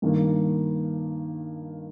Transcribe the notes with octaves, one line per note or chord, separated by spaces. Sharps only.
G2 D#3 A#3